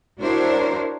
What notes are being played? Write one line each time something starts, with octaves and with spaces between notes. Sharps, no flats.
D4 E4 F#4 A#4 C5 C#5